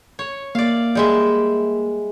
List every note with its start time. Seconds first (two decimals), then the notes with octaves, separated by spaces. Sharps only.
0.19 C#5
0.55 A#3 D5 F5
0.95 G3 G#3 E5